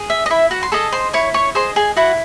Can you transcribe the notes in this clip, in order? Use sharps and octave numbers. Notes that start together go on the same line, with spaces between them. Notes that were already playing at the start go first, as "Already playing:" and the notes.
Already playing: G#4
E5
D#5
E4 E5
F#4 F#5
C6
G#4 A4 D#5 A5
C5 C6
E4 C#5 C#6
C#5 C#6
G#4 C5 D#5 C6
G#4 G#5
E4 F#4 F#5